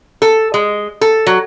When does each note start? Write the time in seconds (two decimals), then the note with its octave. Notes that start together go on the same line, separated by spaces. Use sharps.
0.22 A4
0.54 G#3
1.01 A4
1.27 F#3